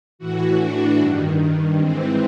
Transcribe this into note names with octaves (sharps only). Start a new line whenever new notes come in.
A2 E3 F#4
D4
G2 D#3
G#2 E3 C4